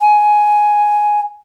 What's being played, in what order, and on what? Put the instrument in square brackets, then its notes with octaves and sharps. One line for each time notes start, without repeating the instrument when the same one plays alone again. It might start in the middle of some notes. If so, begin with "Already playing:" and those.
[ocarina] G#5